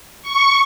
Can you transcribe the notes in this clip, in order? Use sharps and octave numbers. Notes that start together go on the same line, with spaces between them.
C#6